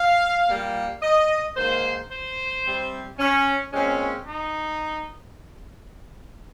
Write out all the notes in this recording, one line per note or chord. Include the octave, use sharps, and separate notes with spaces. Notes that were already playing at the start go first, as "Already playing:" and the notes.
Already playing: F5
A#2 G3 A#3
D#5
G#2 D#3 A#3 C5
C5
C3 G3 C4
C#4
A#2 G#3 C4 C#4
D#4